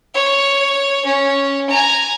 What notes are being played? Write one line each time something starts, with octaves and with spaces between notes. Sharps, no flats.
C#5
C#4
G#5 A#5